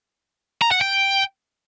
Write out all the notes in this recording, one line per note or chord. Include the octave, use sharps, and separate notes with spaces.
A#5
F#5
G5